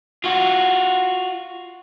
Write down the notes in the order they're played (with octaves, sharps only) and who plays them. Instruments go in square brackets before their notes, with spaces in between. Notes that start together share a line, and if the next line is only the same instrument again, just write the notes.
[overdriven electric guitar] F4 F#4